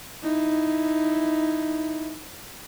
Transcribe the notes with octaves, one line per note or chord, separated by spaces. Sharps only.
D#4 E4